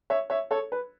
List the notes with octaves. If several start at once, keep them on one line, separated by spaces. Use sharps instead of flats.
C#5 E5
C#5 E5
A4 C#5
B4